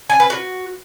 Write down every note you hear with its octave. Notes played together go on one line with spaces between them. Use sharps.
G#5
B4
F#4